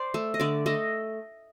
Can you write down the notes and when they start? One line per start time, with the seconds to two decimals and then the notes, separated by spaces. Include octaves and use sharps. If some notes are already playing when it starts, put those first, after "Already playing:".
Already playing: C5 D5
0.14 A3
0.34 D#5
0.40 D3 D5
0.66 A3 D#5